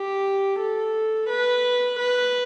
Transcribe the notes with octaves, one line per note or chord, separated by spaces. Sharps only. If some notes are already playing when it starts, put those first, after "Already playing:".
Already playing: G4
A4
B4
B4